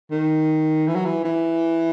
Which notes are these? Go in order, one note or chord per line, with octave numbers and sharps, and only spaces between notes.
D#3
E3
F#3
E3
E3